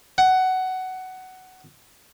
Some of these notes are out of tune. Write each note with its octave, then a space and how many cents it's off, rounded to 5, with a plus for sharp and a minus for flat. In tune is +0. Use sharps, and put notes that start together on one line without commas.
F#5 +15